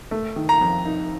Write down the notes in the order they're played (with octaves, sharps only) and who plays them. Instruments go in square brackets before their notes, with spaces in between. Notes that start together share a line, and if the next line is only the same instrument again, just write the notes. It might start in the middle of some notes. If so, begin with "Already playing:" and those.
[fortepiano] A3
D#3
[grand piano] A#5
[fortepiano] F2
D#4